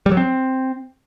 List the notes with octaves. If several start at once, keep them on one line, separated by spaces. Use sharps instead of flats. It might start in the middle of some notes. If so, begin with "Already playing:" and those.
G3
F#3
C4